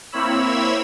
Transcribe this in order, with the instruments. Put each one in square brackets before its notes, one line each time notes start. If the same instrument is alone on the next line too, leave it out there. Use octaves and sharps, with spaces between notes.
[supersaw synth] A#3 C4 E4 C#5 B5 E6